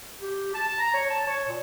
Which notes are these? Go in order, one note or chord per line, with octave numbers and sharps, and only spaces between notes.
G4
A5
A#5
C#5
A5
C#5
A#2